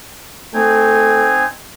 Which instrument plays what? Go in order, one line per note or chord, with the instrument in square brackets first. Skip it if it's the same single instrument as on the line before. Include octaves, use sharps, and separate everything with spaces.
[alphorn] A3 [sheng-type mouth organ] C4 D#4 G#5